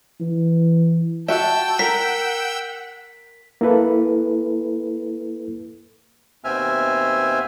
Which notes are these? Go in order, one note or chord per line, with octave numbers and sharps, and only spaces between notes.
E3
F#4 E5 G5 A5 E6
A#4 F#5 B6
A#3 E4 A4 B4
D#2 B2 C4 E5 G#5 F6